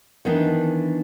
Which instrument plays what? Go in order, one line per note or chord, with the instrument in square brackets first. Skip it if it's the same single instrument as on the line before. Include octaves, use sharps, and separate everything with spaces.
[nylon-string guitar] D#3 E3 B3 D4 D#4